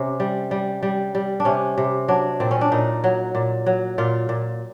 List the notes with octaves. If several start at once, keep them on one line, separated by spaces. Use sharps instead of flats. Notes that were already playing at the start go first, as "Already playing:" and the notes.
Already playing: C3 C#4
G3
G3
G3
G3
D4
C3 C#4
C3
F#3 D4
A#2 C4
C#4
D4
A#2 D#4
F#3
A#2
F#3
A#2 F4
A#2